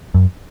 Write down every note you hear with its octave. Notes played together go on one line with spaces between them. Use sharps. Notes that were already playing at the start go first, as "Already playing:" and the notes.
F#2